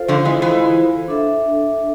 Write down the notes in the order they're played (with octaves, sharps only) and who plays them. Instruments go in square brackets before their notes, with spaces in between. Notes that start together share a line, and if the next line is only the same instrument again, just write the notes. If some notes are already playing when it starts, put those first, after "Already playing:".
Already playing: [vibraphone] F4 A4 C5 F5
[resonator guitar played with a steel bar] D3 F3
E3 G#3
E3 G#3
[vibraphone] D4 A4 E5